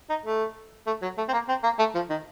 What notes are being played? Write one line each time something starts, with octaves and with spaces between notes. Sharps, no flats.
D#4
A3
A3
F#3
A3
C4
A#3
C4
A#3
A3
F3
D#3